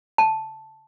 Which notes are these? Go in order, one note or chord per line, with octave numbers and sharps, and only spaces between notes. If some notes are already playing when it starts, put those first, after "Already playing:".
A5